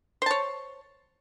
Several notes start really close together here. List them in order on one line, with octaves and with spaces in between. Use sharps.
C5 A5 C#5